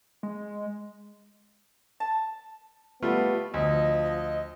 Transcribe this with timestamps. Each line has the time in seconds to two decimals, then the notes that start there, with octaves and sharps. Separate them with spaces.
0.23 G#3
2.00 A5
3.03 G3 A3 B3 F4
3.54 D2 F3 D#5